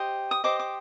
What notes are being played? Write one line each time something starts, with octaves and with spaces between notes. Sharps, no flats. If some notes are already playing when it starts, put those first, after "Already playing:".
Already playing: G4 C5 D#5
D#6
G4 C5 D#5 D6
D6